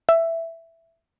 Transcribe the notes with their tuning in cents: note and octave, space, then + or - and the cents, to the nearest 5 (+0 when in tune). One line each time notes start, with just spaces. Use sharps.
E5 +5